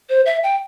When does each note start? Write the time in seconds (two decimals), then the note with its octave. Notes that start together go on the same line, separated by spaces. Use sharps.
0.10 C5
0.26 E5
0.43 G5